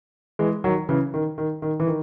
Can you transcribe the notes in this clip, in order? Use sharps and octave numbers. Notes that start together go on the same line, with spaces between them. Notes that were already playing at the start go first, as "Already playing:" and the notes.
E3 G#3
D#3 F#3
C#3 E3
D#3
D#3
D#3
E3
D#3